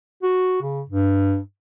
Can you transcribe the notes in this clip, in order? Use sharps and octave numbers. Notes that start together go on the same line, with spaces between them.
F#4
C#3
G2